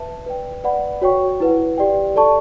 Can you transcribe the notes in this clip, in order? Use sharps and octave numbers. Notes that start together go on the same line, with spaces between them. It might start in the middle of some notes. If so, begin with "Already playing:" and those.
Already playing: B4 E5 A5
B4 D5 G5
B4 D5 F#5 B5
F#4 C#5 G5 C#6
E4 B4 F#5
G4 D5 G5
A4 D5 A5 C#6